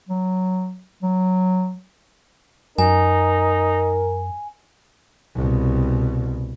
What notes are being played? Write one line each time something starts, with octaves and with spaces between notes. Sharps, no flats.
F#3
F#3
F#2 D#4 A#4 G#5
C2 B2